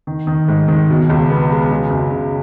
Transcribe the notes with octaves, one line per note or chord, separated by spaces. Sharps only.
D#3
D#3
G#2
D#3
B2
C#2
B3
G#3
C#3
F#2
C#3